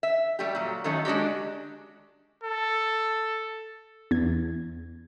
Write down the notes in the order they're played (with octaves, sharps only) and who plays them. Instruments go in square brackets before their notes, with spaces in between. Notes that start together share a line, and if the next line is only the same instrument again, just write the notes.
[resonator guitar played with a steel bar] E5
G3 A3 G4
A#2 F#3
D#3 F#3 A3 C#4 D#4 A4
G#3 D4 F#4 G4
[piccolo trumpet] A4
[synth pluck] E2 G#6